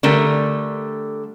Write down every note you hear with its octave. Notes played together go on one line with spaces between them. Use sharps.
D3 G3 A3 A#4